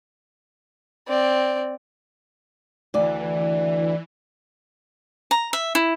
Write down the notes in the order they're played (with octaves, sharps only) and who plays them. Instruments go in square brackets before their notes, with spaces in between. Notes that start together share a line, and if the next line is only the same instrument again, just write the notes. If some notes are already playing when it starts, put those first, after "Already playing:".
[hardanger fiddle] C4 D5
[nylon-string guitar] D2 D5 [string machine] E3
[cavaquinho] A#5
E5
E4